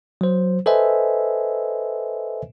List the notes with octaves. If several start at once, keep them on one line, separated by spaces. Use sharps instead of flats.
F#3 C5
A4 B4 C5 D#5 E5 G#5